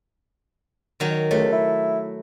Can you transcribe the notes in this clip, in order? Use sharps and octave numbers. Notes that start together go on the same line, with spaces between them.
D#3 F#3
C#2 A3
E4